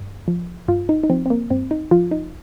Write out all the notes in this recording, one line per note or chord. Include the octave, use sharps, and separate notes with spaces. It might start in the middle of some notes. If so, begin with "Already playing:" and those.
Already playing: G2
F3
G2 F4
D#4
D#4
F3 C4
C4
A#3
G2 C4
D#4
F3 F4
D#4